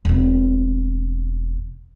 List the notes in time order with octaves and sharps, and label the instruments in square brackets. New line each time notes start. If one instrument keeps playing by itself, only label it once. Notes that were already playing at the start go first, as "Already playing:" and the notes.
[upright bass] E1 C4